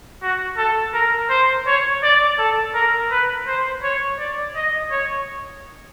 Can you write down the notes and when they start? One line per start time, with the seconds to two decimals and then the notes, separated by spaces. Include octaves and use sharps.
0.23 F#4
0.57 A4
0.94 A#4
1.30 C5
1.67 C#5
2.03 D5
2.39 A4
2.75 A#4
3.11 B4
3.47 C5
3.83 C#5
4.19 D5
4.56 D#5
4.92 C#5